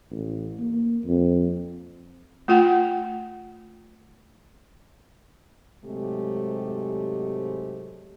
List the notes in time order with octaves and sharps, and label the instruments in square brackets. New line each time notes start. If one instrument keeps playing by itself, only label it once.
[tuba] A1
A#3
F2
[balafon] A3 F4 F#5 G5
[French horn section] G#2 C3 F#3 G#3 A3 G4